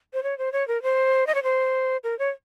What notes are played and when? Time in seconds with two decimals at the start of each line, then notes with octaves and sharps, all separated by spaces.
0.13 C5
0.23 C#5
0.38 C5
0.52 C#5
0.68 A#4
0.83 C5
1.27 D#5
1.35 C#5
1.43 C5
2.04 A#4
2.19 C#5